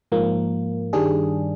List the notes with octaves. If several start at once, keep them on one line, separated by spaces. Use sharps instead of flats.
G#2 F3 A#3
G2 D#3 G3 D4 G#4